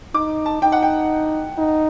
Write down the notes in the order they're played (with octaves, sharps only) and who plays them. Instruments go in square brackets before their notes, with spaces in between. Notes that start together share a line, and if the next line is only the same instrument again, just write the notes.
[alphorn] D#4 [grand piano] D6
[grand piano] A5
[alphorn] D#4 [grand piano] G5
[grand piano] F#5
G5
[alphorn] D#4